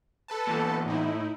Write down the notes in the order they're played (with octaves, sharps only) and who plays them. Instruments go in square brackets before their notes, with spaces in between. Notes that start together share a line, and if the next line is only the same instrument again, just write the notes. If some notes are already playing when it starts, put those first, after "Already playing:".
[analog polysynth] A4 B4 A5
[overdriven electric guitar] E2 A#2
[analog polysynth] A2 D#4 E4